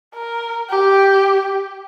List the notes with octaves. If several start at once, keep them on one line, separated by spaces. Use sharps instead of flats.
A#4
G4